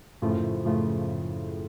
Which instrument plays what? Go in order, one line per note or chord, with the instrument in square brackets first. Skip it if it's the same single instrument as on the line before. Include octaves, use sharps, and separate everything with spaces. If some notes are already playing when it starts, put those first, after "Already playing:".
[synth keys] F#2 C#3 F3 A3 F4 [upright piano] A2
[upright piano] A2
[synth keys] F#2 C#3 F3 A3 F4 [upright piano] A2